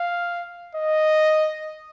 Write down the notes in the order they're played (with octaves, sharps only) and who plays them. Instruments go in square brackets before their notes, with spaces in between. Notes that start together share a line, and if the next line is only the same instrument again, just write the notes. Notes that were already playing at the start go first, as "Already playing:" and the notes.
Already playing: [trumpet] F5
D#5